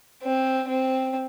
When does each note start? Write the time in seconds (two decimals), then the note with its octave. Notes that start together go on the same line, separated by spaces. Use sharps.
0.23 C4
0.68 C4